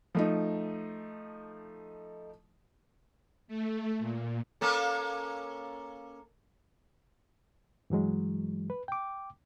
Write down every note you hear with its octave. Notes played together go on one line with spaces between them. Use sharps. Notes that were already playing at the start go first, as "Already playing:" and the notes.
F3 A3 D#4
A3
A#2
A#3 C#4 A4
G2 E3 F#3 G#3
B4
G5 D6